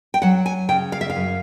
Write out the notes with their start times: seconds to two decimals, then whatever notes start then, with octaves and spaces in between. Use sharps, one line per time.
0.14 G5
0.22 F#3 F#5
0.46 G#5
0.69 C#3 G5
0.92 F5
1.01 E5
1.10 F5
1.15 F#2